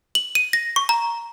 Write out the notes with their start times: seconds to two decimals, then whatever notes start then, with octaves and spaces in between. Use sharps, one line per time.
0.15 F#7
0.35 D#7
0.53 A#6
0.76 C#6
0.89 A#5